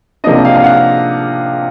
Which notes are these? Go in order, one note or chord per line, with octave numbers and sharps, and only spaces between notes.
C3 F3 A#3 D4 D#5
F5
F5
F#5